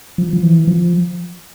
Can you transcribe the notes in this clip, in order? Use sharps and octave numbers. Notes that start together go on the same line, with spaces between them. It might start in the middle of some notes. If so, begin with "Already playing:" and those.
F3
F3
E3
F3